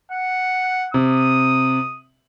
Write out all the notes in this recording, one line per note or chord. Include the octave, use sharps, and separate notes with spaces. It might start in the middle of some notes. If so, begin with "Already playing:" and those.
F#5
C3 D#6